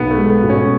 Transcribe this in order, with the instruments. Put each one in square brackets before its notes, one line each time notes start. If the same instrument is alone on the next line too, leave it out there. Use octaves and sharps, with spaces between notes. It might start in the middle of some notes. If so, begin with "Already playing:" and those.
Already playing: [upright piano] B1 [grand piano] B3
[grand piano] A3
[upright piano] G#3
[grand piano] B3
[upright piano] B2
[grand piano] C#4